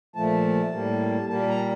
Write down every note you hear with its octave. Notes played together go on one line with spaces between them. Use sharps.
A#2 F3 A3 A5
A2 G3 A#3
A#2 G3 A#3 A5
A#5